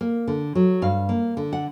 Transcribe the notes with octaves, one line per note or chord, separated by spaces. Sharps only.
A#3
D3
F#3
G2 F5
A#3
D3
F#5